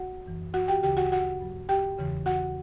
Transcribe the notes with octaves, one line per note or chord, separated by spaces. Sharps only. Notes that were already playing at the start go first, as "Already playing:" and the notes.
Already playing: F#4 F#5
F#2 E3
F#4 F#5
G4 G5
D2 C#3 E3 G4 G5
F#4 F#5
F#4 F#5
G2 F#3
G4 G5
E2 C#3 E3
F#4 F#5